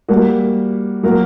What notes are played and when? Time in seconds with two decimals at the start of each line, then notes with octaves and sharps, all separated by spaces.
0.08 G3 A#3 F#4
1.03 F#3 A#3 F#4 A#4